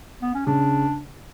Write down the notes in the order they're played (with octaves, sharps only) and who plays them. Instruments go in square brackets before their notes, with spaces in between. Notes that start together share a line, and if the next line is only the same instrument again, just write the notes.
[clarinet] B3
C#4
[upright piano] C#3 [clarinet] D4